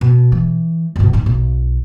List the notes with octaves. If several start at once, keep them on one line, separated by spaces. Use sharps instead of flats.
B2
E3
G1 B2
A2 D#4
B1